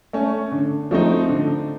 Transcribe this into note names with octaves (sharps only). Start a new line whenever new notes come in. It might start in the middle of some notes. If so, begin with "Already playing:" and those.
A3 C#4
D3
F3 A3 C4 D#4
D3